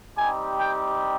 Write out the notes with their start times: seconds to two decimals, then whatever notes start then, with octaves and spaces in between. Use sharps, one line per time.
0.16 G3 C4 D#4 G4 G#5
0.59 G5